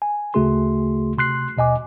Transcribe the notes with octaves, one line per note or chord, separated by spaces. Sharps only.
G#5
D2 C#3 A3 F#4 G#4 C6
C3 C6 F#6 C7
D#2 B2 D#5 G#5 D6